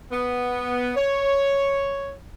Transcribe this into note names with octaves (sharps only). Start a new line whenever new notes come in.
B3
C#5